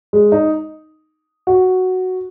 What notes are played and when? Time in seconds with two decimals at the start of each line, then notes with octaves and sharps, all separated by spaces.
0.13 G#3
0.32 D#4
1.47 F#4